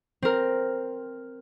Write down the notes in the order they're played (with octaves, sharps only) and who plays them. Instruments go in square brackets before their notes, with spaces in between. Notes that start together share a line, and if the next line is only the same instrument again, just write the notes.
[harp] C4 A#4